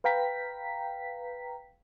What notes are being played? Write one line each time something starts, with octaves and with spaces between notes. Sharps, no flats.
B4 F5 G5 A#5 B6